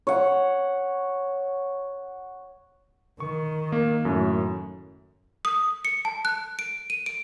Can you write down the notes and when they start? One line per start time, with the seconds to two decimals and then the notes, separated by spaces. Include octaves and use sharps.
0.07 C#5 F#5
3.20 D#3 C#6
3.72 A#3
4.05 F#2 A2
5.45 D#6
5.85 C#7
6.05 A5
6.25 F#6
6.59 D7
6.90 D#7
7.06 D7